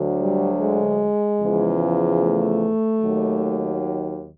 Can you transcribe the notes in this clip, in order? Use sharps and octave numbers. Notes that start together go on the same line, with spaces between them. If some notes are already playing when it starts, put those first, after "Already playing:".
Already playing: D2 D3 F#3
G3
G#3
E2 C#3 F3
A3
D#2 D#3 F#3